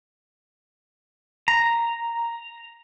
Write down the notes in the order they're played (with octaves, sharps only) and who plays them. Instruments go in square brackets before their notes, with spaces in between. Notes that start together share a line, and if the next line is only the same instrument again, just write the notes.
[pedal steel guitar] A#5